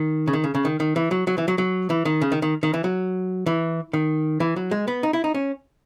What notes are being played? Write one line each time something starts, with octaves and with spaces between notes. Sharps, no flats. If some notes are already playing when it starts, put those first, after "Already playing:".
Already playing: D#3
C#3
D#3
C#3
C#3
D#3
D#3
E3
F#3
F#3
E3
F#3
F#3
E3
D#3
C#3
D#3
D#3
D#3
E3
F#3
E3
D#3
E3
F#3
G#3
B3
D#4
E4
D#4
C#4